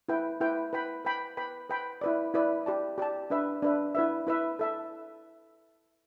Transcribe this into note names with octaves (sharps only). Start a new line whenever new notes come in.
E4 B4 G5
E4 B4 G5
B4 G5 B5
B4 G5 B5
B4 G5 B5
B4 G5 B5
E4 B4 D5
E4 B4 D5
G4 D5 A5
G4 D5 A5
D4 B4 E5
D4 B4 E5
E4 B4 E5
E4 B4 E5
A4 E5 A5